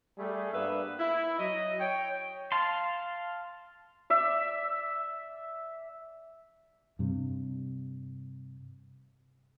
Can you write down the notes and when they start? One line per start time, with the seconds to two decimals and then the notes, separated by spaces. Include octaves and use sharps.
0.18 G3 A3 G#4
0.53 G2 A#3 B3 B4 E5
0.99 E4
1.39 F#3 D#5
1.80 C#5 G5
2.52 F5 A5 C6
4.10 D5 E5
6.99 G2 C3